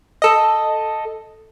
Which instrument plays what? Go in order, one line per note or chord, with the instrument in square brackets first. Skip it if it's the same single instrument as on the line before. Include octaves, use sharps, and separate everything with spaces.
[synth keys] A4 D#5